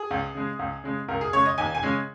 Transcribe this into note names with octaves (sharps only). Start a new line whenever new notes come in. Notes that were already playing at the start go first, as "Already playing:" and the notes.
Already playing: G#4
C#2
C#3 G#3
C#2
C#3 G#3
C#2 A#4
G#4
C#3 G#3 C#5
D#5
D#2 G#5
G#5
C#3 G#3 C#4